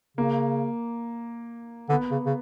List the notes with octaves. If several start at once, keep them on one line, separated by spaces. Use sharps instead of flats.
C#3 A#3
D3 B3
C#3
C#3